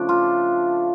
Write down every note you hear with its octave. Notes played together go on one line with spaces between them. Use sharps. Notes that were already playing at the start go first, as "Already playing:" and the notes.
Already playing: C#3 F3 A3 D4
F4